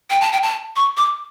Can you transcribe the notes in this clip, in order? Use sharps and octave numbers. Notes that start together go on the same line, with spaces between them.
G5
A5
G5
A5
C#6
D6